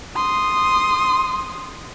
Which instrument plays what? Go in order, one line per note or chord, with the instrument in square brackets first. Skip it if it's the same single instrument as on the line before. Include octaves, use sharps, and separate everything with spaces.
[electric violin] C6 D#6